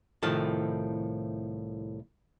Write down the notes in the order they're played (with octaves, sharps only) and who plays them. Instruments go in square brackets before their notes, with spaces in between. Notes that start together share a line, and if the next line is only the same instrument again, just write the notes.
[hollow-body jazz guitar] C2 A2 D#3 F3 A4